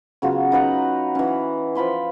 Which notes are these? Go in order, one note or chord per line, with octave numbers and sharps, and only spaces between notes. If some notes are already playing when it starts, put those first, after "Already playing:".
C#3 F#3 B3 F4
D#4 B4 F#5 A#5
E3 C#4
F3 F4 B5 C6